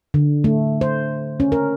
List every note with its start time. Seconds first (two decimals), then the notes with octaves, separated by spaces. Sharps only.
0.14 D3
0.44 A3
0.81 C5
1.40 C#4
1.52 A#4